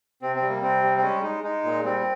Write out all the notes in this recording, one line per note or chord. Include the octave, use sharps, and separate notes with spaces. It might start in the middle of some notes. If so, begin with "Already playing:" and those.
C3 C4
C4
G3
A#3
C3 C4
G3
C4
G#3 C#4
G#3 D#4
G#3 D#4
A#2
G3 C4